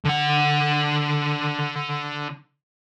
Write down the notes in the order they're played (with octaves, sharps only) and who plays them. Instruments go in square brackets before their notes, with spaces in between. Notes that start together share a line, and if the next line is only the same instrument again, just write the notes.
[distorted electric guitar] D3 F#5